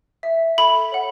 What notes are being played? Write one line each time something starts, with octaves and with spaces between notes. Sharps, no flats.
E5
A4 B5
C#5 F#5